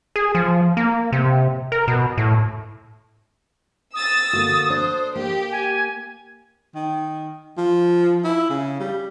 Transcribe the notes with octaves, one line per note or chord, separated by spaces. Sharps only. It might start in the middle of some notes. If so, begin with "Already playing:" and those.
G#4
F3
A#3
C3
A#4
B2
A2
D#6 E6 A6
D3 A#3 F#4
D4 C5
A#3 G4
G#5
D#3
F3
E4
C#3
G3